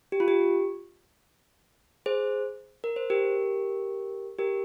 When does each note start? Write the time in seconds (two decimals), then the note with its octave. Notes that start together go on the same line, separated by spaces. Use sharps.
0.12 G4
0.20 F4
0.28 G4
2.06 G#4 C5
2.84 A#4
2.96 C5
3.10 G4 A#4
4.38 G4 A#4